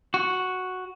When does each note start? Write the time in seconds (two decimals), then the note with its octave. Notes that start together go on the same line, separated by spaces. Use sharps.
0.14 F#4